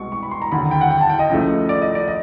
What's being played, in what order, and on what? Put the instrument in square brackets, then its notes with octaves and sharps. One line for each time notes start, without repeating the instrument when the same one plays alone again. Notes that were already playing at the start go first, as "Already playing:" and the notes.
Already playing: [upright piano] C2 B2 G#3 C#6
C#6
B5
C6
A#5
D#2 D3 F#3 B5
G5
F#5
G5
A5
G5
D#5
C#2 C#3 F3 A3
D5
D#5
D5
D#5